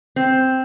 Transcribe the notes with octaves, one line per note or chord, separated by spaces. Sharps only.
C4